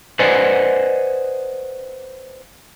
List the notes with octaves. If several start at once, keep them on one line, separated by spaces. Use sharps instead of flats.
B4 C5 D5 D#5 F#5 G#5